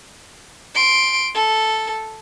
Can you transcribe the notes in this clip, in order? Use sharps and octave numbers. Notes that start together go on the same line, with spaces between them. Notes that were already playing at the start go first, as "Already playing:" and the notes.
C6 D7
A4